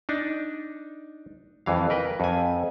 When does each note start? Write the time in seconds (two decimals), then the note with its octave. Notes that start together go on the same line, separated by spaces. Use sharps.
0.09 D4 D#4
1.66 F2 E3 F5
1.90 A#4 B4 G5
2.20 F2 G#5